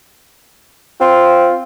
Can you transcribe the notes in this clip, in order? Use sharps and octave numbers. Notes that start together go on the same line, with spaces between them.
C4 F4